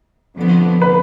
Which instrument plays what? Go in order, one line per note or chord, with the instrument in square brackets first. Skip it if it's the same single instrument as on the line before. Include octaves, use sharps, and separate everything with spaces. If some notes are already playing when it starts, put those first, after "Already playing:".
[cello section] F2 D3 F3 B3
[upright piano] B4